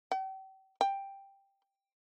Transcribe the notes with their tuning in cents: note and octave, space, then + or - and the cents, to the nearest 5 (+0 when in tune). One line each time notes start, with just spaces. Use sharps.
G5 -40
G5 +5